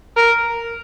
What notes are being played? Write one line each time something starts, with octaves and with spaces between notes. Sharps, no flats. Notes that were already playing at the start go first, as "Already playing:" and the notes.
A#4